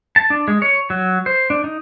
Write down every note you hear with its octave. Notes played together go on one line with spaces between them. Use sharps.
A5
D4
G#3
C#5
F#3
C5
D4
D#4